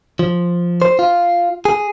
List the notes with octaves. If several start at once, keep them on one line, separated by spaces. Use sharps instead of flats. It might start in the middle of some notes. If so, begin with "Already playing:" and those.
F3
C5
F4
G#4